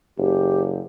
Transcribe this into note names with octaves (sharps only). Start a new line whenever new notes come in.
F#1 G4